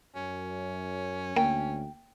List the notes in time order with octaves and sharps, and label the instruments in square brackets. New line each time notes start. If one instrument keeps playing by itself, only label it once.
[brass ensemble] F#2 [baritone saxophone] C#4
[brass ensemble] D2 [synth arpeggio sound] A#3 [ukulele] G5